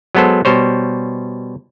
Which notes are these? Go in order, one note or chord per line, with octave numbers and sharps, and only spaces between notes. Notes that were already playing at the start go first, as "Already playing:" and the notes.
F#3 G#3 B3 A4 C5
B2 G3 C5 C#5